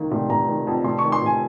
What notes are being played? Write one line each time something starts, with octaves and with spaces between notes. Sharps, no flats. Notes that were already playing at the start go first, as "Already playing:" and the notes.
Already playing: C#2 D#3 A#3
F1
F1 A#5
D#3
F2
F1 C6
C#6
D#3
C6
F1 G#5